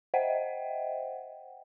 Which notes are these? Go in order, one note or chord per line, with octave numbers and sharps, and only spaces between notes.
C5 D#5 E5 F#5 G5